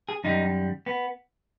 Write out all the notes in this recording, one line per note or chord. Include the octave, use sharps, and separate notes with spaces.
G#4
F#2 D#3 G3 D#4
B3